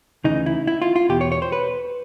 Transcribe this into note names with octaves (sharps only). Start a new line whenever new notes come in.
D2 C#3 E3 D#4
E4
E4
F4
F4
E2 B2 G4
C#5
C#5
C5
B4